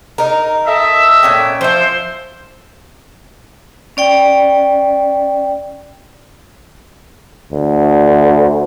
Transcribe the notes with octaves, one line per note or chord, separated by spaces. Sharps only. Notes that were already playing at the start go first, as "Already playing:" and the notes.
D#4 A#4
A4 D#5 E5
A#2 C#4 G5
F3 C5 E5
C#4 D5 G5
D2